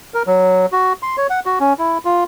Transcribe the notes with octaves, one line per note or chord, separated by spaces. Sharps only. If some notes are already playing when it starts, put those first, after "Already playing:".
A#4
F#3
F#4
C6
C#5
F#5
F#4
C#4
E4
F4